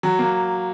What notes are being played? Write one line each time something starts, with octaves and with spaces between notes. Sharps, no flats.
F#3
A#3